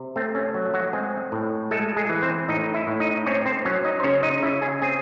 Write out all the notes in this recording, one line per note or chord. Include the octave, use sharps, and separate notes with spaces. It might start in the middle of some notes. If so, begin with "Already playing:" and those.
Already playing: C3
A3 C4
C#4
F#3
F#3 F#4
G#3 C4 G#4
A2
G#3 A3 A4
G#3 G#4
E3
C4 C5
A2 D#4 D#5
E4 E5
A2
D#4 D#5
C4 C#4 C#5
C4 C5
F#3 C#4 C#5
D#4 D#5
C5
C#3 C#4 C#5
D#4 D#5
C#3 E4 E5
G#4 G#5
C4 G#4 G#5